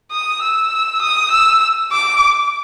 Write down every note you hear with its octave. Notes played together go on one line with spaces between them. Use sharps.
D#6
E6
D#6
E6
D6